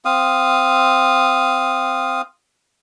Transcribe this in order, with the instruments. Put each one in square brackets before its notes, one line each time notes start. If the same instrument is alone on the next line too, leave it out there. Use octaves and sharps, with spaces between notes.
[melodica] C4 F5 D#6